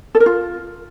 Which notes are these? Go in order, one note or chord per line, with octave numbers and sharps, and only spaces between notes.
A4
A#4
F4